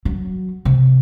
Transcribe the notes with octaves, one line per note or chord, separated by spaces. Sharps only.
F#3
C3